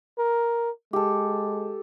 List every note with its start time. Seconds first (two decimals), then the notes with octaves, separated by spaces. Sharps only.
0.18 A#4
0.93 G#3 G4 A4